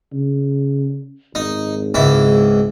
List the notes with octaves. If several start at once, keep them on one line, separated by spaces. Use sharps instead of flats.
C#3
G#1 D#4
C#2 G#2 E4